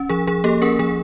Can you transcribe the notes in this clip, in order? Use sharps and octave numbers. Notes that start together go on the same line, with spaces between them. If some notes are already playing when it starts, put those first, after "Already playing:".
Already playing: C#4
F3 G#4
F3 G#4
A#3 G4 A4
C#4 G#4 A#4
F3 G#4